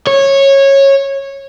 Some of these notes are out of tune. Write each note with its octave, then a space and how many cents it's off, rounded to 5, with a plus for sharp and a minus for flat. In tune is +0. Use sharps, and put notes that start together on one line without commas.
C#5 -15